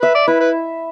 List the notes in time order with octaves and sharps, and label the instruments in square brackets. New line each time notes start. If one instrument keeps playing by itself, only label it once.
[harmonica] B4 [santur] E5
[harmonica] D5
[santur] E4 [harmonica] B4
[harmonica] B4